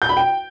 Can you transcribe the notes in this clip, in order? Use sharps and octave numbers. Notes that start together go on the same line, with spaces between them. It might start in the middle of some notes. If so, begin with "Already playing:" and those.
G6
B5
G5